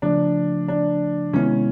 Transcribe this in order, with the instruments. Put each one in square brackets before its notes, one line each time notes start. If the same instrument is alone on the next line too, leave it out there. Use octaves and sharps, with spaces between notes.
[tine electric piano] C#3 F3 A3 [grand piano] D4
[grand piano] D4
[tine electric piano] C3 D#3 G#3 B3 E4 [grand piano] C#4